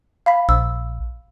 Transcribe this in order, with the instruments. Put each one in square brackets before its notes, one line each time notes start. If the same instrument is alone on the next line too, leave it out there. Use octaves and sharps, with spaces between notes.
[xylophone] F5 B5 B6
[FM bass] A#1 [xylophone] E6